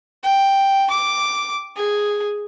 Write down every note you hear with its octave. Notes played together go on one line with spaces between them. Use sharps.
G5
D6
G#4